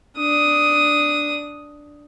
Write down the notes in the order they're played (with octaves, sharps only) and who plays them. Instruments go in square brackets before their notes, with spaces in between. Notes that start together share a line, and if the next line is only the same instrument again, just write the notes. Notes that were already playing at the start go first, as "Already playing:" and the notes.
[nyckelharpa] D4 D#6